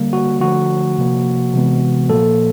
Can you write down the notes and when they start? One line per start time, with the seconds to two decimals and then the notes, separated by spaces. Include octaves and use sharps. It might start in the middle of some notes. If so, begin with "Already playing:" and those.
Already playing: D3 G3 A#3
0.13 F#4
0.40 D3 F3 A3 F#4
0.98 C3 F3 A#3
1.53 C3 E3 G#3 B3
2.09 A#2 F3 A#3 A4